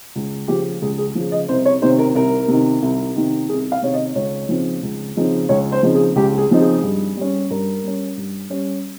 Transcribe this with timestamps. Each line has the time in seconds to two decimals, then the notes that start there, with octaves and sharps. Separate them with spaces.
0.15 C#2
0.48 C#3 F3 G4
0.82 C#2 G#4
0.98 G#4
1.15 C#3 F3
1.32 D#5
1.49 C2 C5
1.65 C#5
1.82 C3 D#3 C5
1.99 A#4
2.15 C2 A#4
2.48 C3 D#3
2.82 C2
3.16 C3 D#3
3.49 C2 G#4
3.72 F5
3.82 C3 D#3 C#5
3.94 D#5
4.15 C#2 C#5
4.49 C#3 F3 C4 D#4
4.83 C#2
5.17 C#3 F3 C4 D#4
5.49 C#2 C#5
5.72 C5
5.83 C#3 F3 C4 D#4
5.94 G#4
6.16 C#2 G4
6.38 G#4
6.50 C#3 F3 C4 D#4
6.61 G#4
6.83 G2
7.17 G3 C#4
7.50 G2 A#4
7.84 G3 C#4
8.17 G2
8.50 G3 C#4